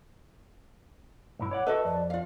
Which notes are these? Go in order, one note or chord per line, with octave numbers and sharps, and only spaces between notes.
B1 G2 E4
C#5 D5 F#5
F#4 A4 B4 D#5 E5
F2 D5
F4 F5